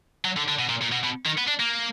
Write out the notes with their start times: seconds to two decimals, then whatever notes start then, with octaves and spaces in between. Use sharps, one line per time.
0.25 F#3
0.37 D3
0.48 D3
0.59 B2
0.69 A#2
0.82 A#2
0.92 B2
1.04 B2
1.25 D#3
1.38 B3
1.48 D4
1.60 A#3